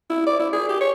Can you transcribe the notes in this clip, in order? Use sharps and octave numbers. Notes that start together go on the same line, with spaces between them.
E4
D5
E4
G#4
G4
C#5